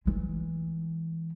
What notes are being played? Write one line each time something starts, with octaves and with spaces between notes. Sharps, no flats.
E3 G#3